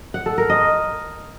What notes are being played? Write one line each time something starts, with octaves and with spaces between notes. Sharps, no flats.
F#5
A4
A#4
D#5